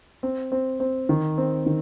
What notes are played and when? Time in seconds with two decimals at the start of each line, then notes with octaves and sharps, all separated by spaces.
0.23 C4
0.52 C4
0.80 C4
1.09 D#3
1.38 C4
1.66 D#3